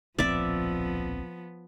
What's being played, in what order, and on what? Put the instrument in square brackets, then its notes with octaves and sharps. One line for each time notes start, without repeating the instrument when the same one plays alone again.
[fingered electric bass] D1 A#1 C4 [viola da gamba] F3 B3 [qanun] D5 E5